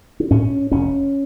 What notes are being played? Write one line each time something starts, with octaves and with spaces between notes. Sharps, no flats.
D4
A2 C#4
F1 C#4